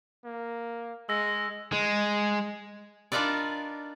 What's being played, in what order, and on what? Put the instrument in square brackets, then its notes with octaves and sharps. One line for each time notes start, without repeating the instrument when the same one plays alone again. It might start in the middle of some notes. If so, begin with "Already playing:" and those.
[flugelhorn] A#3
[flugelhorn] G#3 [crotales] E6 A#6
[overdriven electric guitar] G#3
[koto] D4 D#4 F4 A#4 B4 D5